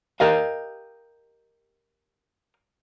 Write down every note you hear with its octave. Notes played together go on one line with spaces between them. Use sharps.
G4 A#4 D#5 F5